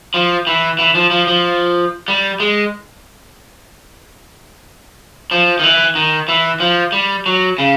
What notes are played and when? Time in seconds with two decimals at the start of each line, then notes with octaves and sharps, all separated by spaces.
0.14 F3
0.47 E3
0.79 E3
0.95 F3
1.11 F3
1.27 F3
2.08 G3
2.40 G#3
5.31 F3
5.59 D#3
5.63 E3
5.95 D#3
6.28 E3
6.60 F3
6.92 G3
7.26 F#3
7.58 C#3